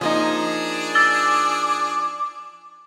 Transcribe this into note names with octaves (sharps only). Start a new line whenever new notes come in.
F3 A#3 D4 D#4 G#4
D6 E6 A6 G7